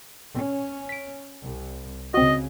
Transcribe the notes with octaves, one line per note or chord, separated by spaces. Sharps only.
C#4
B6 D7
C2
C#2 C#3 C4 F#4 D#5